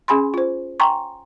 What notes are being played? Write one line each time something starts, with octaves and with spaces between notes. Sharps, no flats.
C#4 G#4 G#5 B5 C6
F4 C5
G5 G#5 A#5 C6 C#6